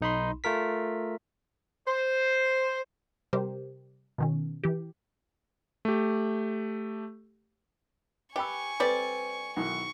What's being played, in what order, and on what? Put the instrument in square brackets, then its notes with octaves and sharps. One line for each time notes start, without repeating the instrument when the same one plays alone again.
[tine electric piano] B1 D#4 B5 C6
A3 F4 A#4 B6
[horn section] C5
[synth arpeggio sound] C3 G3 G4 A#4 C5
B2 D#3 C#4
E3 G4
[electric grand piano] A3 G4
[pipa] G4 [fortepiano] B4 B5 [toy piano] D#5 G5 E6 [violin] G#5 C#6
[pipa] G3 D5 [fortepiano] C4 [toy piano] A4 B4
[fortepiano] B1 D#3 E3 [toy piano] D#4 [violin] C#6